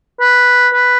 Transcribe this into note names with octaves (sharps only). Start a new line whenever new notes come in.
B4
B4